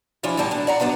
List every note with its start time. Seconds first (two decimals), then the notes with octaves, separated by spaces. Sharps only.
0.23 F3 C#4 D4 E4
0.37 E2 A2 G3 A#3 A5
0.51 E2 D4
0.67 D5 F#5 A#5
0.80 F#2 B3 D4 C5